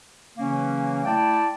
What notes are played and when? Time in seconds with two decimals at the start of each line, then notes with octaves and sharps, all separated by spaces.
0.38 C#3 E3 F#3 A#3 C#4
1.05 A3 E4 D5 G5 A5